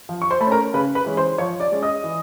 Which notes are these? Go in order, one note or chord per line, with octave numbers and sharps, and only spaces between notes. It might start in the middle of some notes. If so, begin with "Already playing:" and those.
F3
C#6
C5 C6
A3 B5
C#4
A#4 A#5
C#3 B4 B5
B4 B5
E3 G#3 C#4
C5 C6
F3 C#5 C#6
D5 D6
G#3 C#4
D#5 D#6
E3